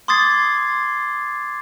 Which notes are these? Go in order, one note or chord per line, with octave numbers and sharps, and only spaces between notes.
C6 D6 D#6 G#6 A6 C7